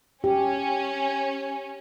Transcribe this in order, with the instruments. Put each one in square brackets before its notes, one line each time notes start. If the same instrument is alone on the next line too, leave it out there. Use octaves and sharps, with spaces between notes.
[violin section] C#4 [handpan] G4